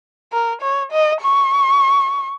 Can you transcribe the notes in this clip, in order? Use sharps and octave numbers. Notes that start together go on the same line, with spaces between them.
A#4
C#5
D#5
C#6